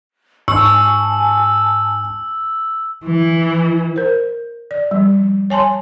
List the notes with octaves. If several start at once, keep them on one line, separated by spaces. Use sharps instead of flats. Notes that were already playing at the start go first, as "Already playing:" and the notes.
G#2 G#5 A5 C#6 E6
E3
A#4 C5
D5
F3 G3
C#5 G#5 A5 C6